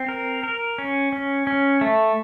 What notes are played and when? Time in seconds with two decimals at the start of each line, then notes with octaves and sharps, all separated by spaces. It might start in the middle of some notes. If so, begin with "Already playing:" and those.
Already playing: C4
0.09 A#4
0.43 A#4
0.78 C#4
1.13 C#4
1.47 C#4
1.81 A3